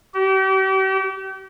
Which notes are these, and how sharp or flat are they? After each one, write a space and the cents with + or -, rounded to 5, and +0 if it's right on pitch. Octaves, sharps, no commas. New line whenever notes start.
G4 -40